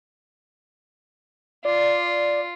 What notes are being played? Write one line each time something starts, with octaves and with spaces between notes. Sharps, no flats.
F4 D5